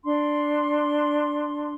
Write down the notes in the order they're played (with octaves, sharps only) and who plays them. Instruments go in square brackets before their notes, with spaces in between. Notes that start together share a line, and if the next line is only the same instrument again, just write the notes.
[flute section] D4 C6